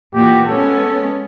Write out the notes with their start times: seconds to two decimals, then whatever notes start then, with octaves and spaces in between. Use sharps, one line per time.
0.13 A#2 E3 F#4 G4
0.46 G#3 B3 C#4 A4